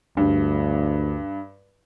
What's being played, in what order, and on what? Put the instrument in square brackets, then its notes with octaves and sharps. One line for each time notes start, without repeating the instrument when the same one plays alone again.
[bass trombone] D2 [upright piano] G2